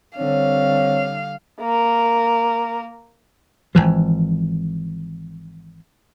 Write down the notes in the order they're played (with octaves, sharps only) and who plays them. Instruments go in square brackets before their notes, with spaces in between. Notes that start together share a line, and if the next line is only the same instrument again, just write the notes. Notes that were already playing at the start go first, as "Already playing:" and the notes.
[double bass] D3 G3 [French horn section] C4 C#5 [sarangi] F5
[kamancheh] A#3 A#4
[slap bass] G#1 E2 E3 F3